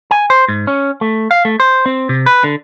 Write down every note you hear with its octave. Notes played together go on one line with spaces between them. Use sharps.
G#5
C5
G#2
C#4
A3
F5
A3
C5
C4
C3
B4
D3